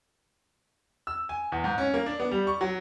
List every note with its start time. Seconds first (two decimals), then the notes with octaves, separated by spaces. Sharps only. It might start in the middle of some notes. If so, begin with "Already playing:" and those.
1.07 E6
1.29 G#5
1.52 E2
1.64 G#2
1.78 C#4
1.94 A#3
2.06 D4
2.20 B3
2.31 G3
2.47 C#6
2.61 F#3